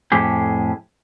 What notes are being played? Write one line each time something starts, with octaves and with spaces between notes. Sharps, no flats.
F2 A2 G4 G#4